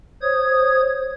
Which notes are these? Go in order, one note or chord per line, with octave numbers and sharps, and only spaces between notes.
C5 C#5 D#6 G#6